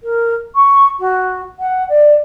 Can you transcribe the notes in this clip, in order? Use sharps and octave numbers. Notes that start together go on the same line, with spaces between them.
A#4
C#6
F#4
F#5
D5